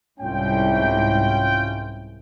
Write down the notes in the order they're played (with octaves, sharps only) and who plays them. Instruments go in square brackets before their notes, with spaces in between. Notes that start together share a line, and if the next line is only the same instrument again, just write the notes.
[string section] C2 G#2 [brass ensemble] C#4 F4 G5